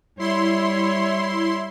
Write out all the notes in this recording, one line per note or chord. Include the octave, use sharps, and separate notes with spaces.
G3 E4 C#5 C6